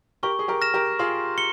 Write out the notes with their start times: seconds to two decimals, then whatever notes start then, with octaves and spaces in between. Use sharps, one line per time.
0.23 G4 A#4 C#6
0.39 G#4
0.48 G4 A#4
0.61 F6 A#6 E7
0.74 G4 A#4
0.99 F4 G#4 C6
1.38 C#7 G7